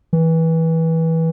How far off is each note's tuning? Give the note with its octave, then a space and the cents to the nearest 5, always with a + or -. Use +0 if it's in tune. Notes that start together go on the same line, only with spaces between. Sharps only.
E3 -20